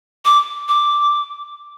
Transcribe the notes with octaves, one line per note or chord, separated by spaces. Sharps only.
D6
D6